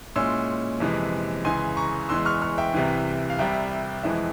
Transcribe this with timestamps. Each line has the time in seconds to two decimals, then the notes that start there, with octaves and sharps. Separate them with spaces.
0.16 A#2 G#3 C#4 E4 C6 E6
0.80 F2 C3 E3 G#3
1.44 C#2 C#3 E3 G#5 C6
1.77 A#5 C#6
2.09 E2 E3 G#3 C6 E6
2.25 C#6 F6
2.42 C#6 F6
2.58 E5 G5
2.74 C2 C3 E3
3.30 F5
3.39 C2 C3 G3 E5 G5
4.03 F2 E3 G#3 E4